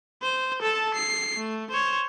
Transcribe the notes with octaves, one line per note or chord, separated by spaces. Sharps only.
C5
A4 A5
C7
A3
C5 C#5